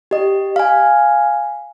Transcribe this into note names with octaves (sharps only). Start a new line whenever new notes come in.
G4 D#5
F5 G#5